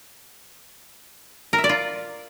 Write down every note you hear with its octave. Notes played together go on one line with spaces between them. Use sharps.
A#4
E5
D5
F4